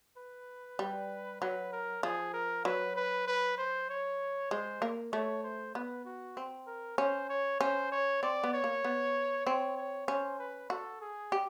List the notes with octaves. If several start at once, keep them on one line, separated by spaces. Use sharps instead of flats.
B4
G3
F#3 B4
A#4
F3 G#4
A#4
F#3 B4
B4
B4
C5
C#5
G#3 C5
A#3
A3 C#5
C5
B3 B4
F#4
C4
A#4
C#4 C5
C#5
C#4 C5
C#5
C4 D5
B3
C#5
A#3
B3
C4 C#5
C#5
C#4 C5
B4
F#4 A4
G#4
G4